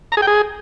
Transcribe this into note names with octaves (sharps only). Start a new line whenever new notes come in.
A#5
G#4
G5
G#4